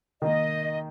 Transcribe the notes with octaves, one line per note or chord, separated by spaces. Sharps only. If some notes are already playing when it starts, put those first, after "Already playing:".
D#3 A#3 D#4 D#5